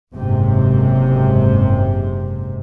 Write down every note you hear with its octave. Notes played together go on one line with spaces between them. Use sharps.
F#1 G#2 C3